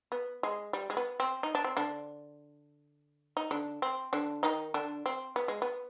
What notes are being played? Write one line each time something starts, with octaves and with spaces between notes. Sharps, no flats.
B3
G#3
G3
G#3
B3
C4
D#4
D4
C4
D3 D4
D#4
D3 D4
C4
D3 D4
D#3 D#4
D3 D4
C4
B3
G#3
B3